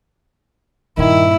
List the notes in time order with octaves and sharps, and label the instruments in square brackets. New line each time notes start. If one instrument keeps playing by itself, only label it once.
[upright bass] G2 A#2 [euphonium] D#3 [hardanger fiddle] E4